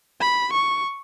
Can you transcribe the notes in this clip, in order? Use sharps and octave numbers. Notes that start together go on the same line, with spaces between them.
B5
C#6